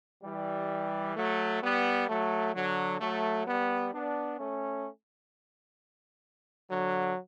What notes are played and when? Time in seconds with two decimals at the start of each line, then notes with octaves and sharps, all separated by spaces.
0.24 E3 G3
1.16 F#3 A3
1.63 G3 B3
2.08 F#3 A3
2.54 D3 F#3
3.00 F#3 A3
3.47 G3 B3
3.93 B3 D4
4.39 A3 C#4
6.69 D3 F#3